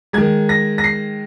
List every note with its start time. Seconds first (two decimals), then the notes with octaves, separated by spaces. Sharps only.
0.13 D#3 G#3 G#6
0.49 A#6
0.78 A#6
0.84 C7